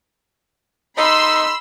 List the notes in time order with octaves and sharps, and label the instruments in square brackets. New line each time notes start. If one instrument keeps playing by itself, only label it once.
[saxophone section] D#4 A4 D#5 [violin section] B5 C6 E6